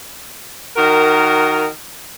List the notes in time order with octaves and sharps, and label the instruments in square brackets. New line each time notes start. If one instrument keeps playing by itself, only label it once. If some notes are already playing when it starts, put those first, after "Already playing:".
[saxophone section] D#3 F#4 A#4